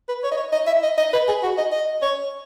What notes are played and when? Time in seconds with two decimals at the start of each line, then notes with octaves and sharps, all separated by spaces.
0.09 B4
0.24 C#5
0.32 D#5
0.37 C#5
0.52 D#5
0.67 E5
0.83 D#5
0.98 D#5
1.13 B4
1.28 G#4
1.43 F#4
1.58 D#5
1.72 D#5
2.02 C#5